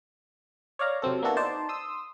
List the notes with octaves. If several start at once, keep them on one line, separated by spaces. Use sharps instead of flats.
C#5 D5 F5 A#5
C3 F#3 C4 A4
A#3 B3 D4 E4 F#4 A4
D#4 C5 D5 A5
C6 D#6 E6